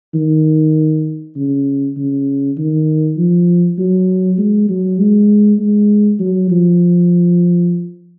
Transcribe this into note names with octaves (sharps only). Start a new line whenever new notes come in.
D#3
C#3
C#3
D#3
F3
F#3
G#3
F#3
G#3
G#3
F#3
F3